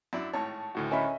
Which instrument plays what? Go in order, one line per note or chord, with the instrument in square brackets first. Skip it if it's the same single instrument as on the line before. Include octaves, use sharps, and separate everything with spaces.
[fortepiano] F#2 D4 E4
[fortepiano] G#1 A2 C#5 [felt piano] A5
[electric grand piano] D2 A2 F#4 [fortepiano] D#3
[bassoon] C#4 [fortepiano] A#4 [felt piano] D#5 E5 B5